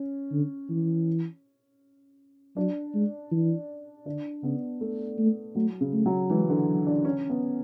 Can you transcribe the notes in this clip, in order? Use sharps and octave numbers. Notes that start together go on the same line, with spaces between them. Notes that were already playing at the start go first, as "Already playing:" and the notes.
Already playing: C#4
D3
E3
F#3 D4
G#3
E3
D3 D4
C#3 B3
A3
A3
F#3 A3
C#3
A3
F#3
E3 G#3
D3
F#3
D4
D3 C#4
B3